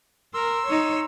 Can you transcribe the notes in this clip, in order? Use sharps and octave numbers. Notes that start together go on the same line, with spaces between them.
A#4 C6 E6
D#4 C#5